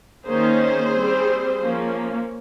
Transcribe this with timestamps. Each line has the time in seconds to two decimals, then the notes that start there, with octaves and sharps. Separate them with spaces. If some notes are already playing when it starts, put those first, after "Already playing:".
0.25 D#3 A#3 C#4 G#4 C5
0.93 G3 C4
1.59 F3 A#3 C#4